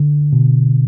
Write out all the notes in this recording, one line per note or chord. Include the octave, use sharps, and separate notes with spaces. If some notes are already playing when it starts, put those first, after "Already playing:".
Already playing: D3
B2